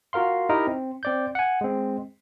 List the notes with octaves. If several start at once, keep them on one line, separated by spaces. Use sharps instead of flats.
F4 F#4 A#4 F5 C6
D#4 E4 G4 A#4 D#5
C4
C4 D5 G6
F#5 G#5
G#3 C4